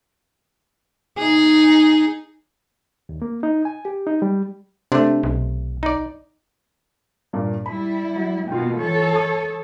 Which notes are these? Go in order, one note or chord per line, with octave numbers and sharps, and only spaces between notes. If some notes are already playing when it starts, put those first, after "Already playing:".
D#4 G#4
D#2
A#3
D#4
G#5
G4
D#4
G3
C3 A3 D4
B1
D#4 D5
G2 A#2 A#3
G3 E4 B5
F#3
B2 A#3 F4 G5
E3 A4 C#5
D#6